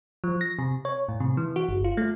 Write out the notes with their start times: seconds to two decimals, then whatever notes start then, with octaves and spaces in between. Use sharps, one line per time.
0.24 F3
0.41 A#6
0.59 C3
0.85 C#5
1.08 A2
1.20 C3
1.37 E3
1.56 F#4
1.68 G1
1.84 F4
1.97 A3